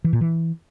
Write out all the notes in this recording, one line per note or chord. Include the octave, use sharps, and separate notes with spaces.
E3
A#2
E3